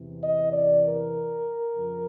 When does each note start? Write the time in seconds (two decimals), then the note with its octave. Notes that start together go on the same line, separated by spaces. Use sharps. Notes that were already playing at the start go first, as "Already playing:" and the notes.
Already playing: E2 C3 E3
0.23 D#5
0.53 D5
0.84 A#4
1.75 F2 C#3 F3